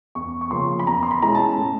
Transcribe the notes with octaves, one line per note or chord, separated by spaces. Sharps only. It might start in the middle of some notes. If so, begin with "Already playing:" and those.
E2 C#6
C#6
C#3 F3 A#3 C#4 C6
B5
E2 A#5
C6
B5
B2 G#3 C#4 E4 A#5
A5
A2